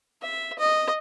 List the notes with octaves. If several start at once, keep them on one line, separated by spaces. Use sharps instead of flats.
E5
D#5